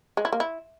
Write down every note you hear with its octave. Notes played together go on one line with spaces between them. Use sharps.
G#3
E4
A#3
E4